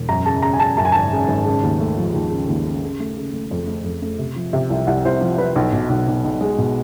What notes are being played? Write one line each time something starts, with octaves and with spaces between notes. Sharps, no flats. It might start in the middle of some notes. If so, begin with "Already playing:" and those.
Already playing: E1
F#2 A#5
C#3 A5
C#3 A#5
G#5
C#3 A5
F#2 A5
G#5
G#1 A5
C#3
G#1
C#3
D#2
A3
F3
D#2
C#3
D#2
C#3
C#3
A3
C#3
A3
F2
A3
F2
A3
C3
F3
C3
C2
C2 F#5
C2 C5
F3
F3 B4
B1
B2
B1
B1
B1
G#3
B2